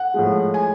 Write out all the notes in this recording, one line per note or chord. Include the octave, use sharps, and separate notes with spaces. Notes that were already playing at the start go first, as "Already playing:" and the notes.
Already playing: F#5
A2 F3 G#3
G#5